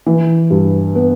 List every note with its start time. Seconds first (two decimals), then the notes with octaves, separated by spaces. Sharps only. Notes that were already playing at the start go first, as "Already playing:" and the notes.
0.06 E3
0.50 G2
0.95 B3